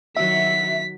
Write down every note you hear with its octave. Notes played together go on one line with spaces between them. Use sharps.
D#3 F#3 F#4 E5 B6